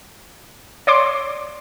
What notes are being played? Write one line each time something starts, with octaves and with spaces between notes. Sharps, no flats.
C#5 D5 C6 D6